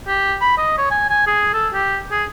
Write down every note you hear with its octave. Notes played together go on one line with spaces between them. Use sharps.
G4
B5
D#5
C#5
G#5
G#5
G#4
A4
G4
G#4